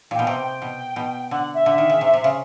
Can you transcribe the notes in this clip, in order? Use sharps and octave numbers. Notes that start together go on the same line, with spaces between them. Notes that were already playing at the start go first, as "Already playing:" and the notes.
A#2 G5
B2
C3 G5
G5
B2
B2
D3 F#5
E5
D3
D#3
C#3
C3
C3
C#3